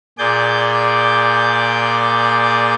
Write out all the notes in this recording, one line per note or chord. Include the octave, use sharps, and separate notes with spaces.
A#2 G#4 D5 D6 G6